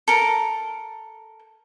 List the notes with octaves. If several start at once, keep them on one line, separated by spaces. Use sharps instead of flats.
A4 A#4